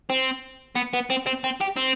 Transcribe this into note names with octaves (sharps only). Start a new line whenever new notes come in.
C4
B3
B3
C4
C4
C4
G4
C4